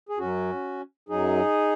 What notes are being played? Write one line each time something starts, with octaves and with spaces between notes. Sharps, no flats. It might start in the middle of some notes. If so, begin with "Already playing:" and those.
G#4
F#2 F#3 C#4 F#4
F#2 F#3 D#4 G#4